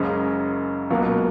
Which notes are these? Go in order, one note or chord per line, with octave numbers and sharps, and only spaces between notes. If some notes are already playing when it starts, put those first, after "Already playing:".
Already playing: F#1 F#2 C#3 G#3 C#4
C#2 B2 F#3 A#3